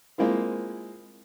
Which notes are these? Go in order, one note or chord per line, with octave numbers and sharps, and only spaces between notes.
G#3 A#3 C4 E4 F4